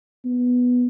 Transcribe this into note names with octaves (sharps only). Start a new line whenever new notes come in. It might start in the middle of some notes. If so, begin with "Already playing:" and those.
B3